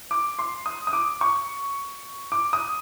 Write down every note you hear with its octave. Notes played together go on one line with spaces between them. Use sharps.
D6
C6
D#6
D#6
D6
C#6
D6
D#6